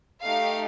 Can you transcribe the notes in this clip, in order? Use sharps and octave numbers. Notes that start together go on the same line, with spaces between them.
A3 D#4 G4 F5